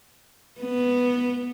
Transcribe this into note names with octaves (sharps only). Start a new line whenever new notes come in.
B3